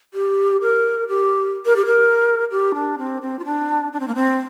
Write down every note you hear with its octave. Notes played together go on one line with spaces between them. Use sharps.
G4
A#4
G4
A#4
G4
A#4
G4
D4
C4
C4
F4
D4
D4
C4
A#3
C4